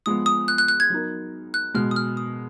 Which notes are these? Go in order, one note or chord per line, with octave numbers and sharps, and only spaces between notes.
F3 G#3 B3 D#6
D#6
F#6
F#6
F#6
G#6
F#3 B3 D#4 A#4
F#6
B2 G#3 B3 F6
D#6
F6
D#6